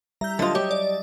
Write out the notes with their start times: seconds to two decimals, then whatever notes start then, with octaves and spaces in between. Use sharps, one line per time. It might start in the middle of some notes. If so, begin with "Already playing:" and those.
0.21 G3 G4 E5 A#5 G6
0.39 D3 F#3 F4 D#5 A5
0.55 G4 C#5
0.71 D5